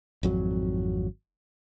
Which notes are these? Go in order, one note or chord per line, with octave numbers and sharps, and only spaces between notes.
G#1 F2 F#3